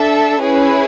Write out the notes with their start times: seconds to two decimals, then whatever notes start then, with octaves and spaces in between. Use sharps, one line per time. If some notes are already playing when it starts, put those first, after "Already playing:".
Already playing: D4 A4 E5
0.41 C#4 E4 G#4 B4